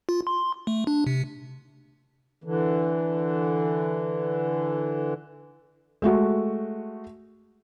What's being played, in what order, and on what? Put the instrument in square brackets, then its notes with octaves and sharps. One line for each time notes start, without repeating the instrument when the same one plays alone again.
[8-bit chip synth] F4
C6
A3
D4
C3
[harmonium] D3 E3
[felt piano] G#3 A3 F#4